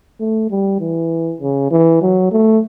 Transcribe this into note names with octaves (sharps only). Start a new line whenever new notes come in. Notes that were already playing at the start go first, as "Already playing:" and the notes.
A3
G3
E3
C#3
E3
F#3
A3